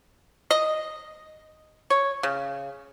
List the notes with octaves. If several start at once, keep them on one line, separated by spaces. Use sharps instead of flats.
D#5
C#5
C#3